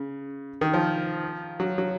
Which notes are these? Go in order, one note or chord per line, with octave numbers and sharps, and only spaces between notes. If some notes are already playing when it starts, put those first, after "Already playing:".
Already playing: C#3
D#3
F3
F#3
F#3